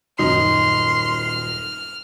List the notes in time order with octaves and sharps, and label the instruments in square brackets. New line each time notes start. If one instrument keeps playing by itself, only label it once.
[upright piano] D#1 F#2 [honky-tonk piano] D#4 [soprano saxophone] C6 [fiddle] F6